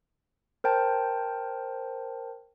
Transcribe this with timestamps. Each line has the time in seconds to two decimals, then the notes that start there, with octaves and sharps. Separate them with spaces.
0.64 A#4 C5 G5 A5